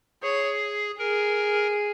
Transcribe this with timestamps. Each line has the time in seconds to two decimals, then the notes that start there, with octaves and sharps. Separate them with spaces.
0.23 G#4 C#5
0.99 G#4 A#4